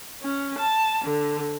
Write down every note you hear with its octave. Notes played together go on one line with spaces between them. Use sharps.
C#4
A5
D3